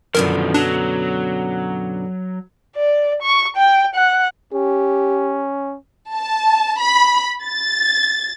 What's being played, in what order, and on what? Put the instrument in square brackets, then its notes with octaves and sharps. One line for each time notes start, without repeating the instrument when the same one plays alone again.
[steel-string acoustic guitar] F#2 B2 D3 [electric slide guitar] D#3 F3 [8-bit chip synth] A#4
[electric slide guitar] F#3 [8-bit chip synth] D4
[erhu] D5
C#6
G5
F#5
[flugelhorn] C#4 [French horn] G4
[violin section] A5
B5
A6